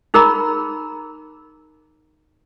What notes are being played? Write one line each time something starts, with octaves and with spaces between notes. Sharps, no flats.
D#4 G#4 A#4 A#5 B5